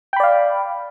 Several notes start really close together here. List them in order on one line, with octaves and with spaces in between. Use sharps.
G5 B5 D5 F5